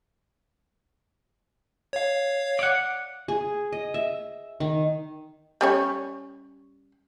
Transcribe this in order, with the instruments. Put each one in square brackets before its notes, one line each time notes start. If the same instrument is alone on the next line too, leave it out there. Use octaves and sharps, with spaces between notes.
[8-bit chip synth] C#5 F5
[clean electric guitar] D5 F#5
[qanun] G#4
D#5
E5
D#3
[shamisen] G3 C#4 C#5